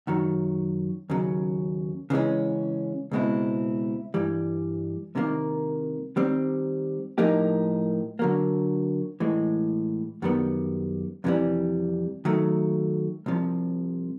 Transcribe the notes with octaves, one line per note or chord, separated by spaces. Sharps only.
F#2 D#3 F#3
D#2 C#3 F#3
C#3 E3 G#3 C#4
C#2 B2 G#3 C4 E4
G2 E3 G3
C2 C3 D#3 G3 A#3
D#3 G3 C4
A2 F3 A#3 D#4 G4
D3 F#3 A#3
A2 E3 G#3
F#2 D#3 G3 B3
F2 C3 E3 G3
D#3 F#3 A3
C2 C3 F3